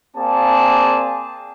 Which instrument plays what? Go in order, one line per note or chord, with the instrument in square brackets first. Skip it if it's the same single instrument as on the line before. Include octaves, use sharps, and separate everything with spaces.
[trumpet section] A#3 C4 G#4 D5 A5